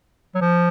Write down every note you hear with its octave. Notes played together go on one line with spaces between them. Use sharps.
F#3
F3